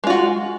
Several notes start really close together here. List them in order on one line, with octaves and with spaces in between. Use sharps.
G#3 F4 F#4